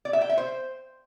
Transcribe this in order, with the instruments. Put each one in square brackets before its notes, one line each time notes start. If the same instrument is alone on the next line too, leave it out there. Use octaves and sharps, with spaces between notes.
[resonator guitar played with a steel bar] D5
E5
G5
E5
C5